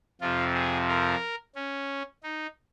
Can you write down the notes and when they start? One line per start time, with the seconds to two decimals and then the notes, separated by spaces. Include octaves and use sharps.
0.21 F2 C3 F3 F4
0.54 G#4
0.88 A#4
1.55 C#4
2.23 D#4